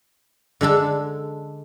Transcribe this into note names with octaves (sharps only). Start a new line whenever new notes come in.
D3 G#3 D4 A4